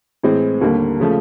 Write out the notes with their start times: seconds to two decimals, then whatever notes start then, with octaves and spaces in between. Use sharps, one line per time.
0.23 A2 E3 G#3 C4
0.61 D#2 D3 G3 A#3
1.00 C#3 F3 A3